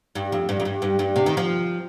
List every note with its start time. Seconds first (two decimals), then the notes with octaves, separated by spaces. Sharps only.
0.15 G2
0.32 F2
0.49 G2
0.60 F2
0.65 G2
0.82 G2
0.99 G2
1.16 C3
1.26 D#3
1.37 F3